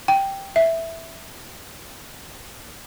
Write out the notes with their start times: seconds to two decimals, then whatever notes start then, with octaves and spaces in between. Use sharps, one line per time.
0.08 G5
0.56 E5